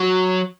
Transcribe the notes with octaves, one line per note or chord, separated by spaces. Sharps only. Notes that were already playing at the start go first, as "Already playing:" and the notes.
Already playing: F#3